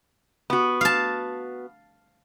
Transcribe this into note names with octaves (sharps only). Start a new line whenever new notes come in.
B3 F#4
F5 A5